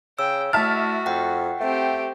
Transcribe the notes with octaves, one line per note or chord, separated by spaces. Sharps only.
C#3 G5 E6
A3 E4 F#4 E5 A5 F6 A6
F2 F#5 G5
A3 C4 G4